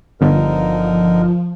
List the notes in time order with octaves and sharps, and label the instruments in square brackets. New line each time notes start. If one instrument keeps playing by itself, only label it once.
[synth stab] G1 [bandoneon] D3 D#4 A#4 [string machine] F3